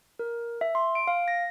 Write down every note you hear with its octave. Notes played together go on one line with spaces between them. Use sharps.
A#4
E5
C6
D7
F5
A#6